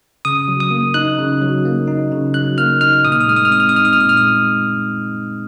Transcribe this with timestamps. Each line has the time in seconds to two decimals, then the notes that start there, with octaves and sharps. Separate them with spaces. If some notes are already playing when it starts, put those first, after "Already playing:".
0.25 C#3 D#6
0.48 F#3
0.60 D#6
0.71 A#3
0.94 D#4 F#6
1.19 C#3
1.41 F#3
1.65 A#3
1.88 D#4
2.12 C#3
2.34 F#3 F#6
2.58 A#3 F6
2.81 D#4 F6
3.05 A#2 D#6
3.12 F6
3.20 D#6
3.28 G#3 F6
3.36 D#6
3.45 F6
3.51 C4 D#6
3.60 F6
3.69 D#6
3.75 D#4 F6
3.85 D#6
3.93 F6
3.98 A#2 D#6
4.09 F6
4.17 G#3 D#6